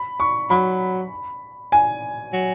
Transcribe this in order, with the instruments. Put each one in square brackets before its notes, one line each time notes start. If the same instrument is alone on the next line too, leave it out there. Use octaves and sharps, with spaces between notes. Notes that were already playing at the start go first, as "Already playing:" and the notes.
Already playing: [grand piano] B5
C#6
[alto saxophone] F#3 [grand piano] B5
[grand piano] G#5
[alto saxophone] F#3